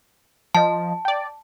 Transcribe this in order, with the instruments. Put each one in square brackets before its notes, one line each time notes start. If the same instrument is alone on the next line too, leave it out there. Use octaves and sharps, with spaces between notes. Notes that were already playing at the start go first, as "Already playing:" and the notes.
[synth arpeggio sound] F3 D#5 [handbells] A5
[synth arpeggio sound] D5 G5